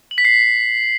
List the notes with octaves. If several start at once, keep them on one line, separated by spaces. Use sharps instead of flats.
F#7
B6
C7